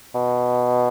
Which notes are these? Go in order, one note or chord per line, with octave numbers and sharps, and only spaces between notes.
B2